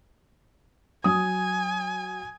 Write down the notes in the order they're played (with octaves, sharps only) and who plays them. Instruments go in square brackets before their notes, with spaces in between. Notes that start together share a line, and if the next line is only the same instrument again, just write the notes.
[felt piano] F#3 D#6 [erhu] G#5